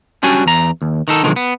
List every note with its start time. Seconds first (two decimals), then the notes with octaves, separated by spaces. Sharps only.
0.23 G3 C#4 D4 F#4 G#5
0.46 E2 A#5
0.82 D#2
1.08 D#3 D#4 A4
1.23 B1 D3 D#3 F3 G#3
1.36 B3